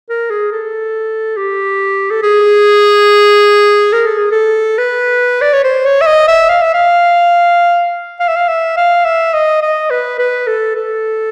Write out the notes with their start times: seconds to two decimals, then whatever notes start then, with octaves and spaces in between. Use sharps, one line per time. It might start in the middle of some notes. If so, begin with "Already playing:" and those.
0.09 A#4
0.30 G#4
0.52 A4
1.37 G4
2.10 A4
2.23 G#4
3.93 A#4
4.06 A4
4.18 G#4
4.31 A4
4.78 B4
5.42 D5
5.53 C#5
5.64 C5
5.85 C#5
6.01 E5
6.06 D#5
6.28 E5
6.49 F5
6.62 E5
6.74 F5
8.20 F5
8.28 E5
8.36 F5
8.48 E5
8.77 F5
9.05 E5
9.33 D#5
9.62 D#5
9.90 B4
10.19 B4
10.47 A4
10.76 A4